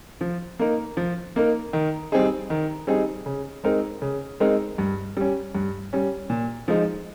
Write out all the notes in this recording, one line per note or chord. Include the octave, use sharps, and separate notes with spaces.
F3
A#3 D#4 A#4
F3
A#3 D#4 A#4
D#3
G3 C4 D#4 G#4
D#3
G3 C4 D#4 G#4
C#3
G#3 C4 D#4 A#4
C#3
G#3 C4 D#4 A#4
G2
G3 C#4
G2
G3 C#4
A#2
F3 G#3 D#4